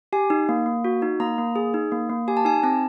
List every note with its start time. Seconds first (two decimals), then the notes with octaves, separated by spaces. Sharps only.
0.13 G4 G#5
0.30 D#4
0.49 A#3
0.66 A#3
0.84 F#4
1.02 D#4
1.20 A#3 A#5
1.38 A#3
1.56 G#4
1.74 D#4
1.92 A#3
2.10 A#3
2.28 G4 G#5
2.37 A5
2.45 D#4 G#5
2.63 C4 A5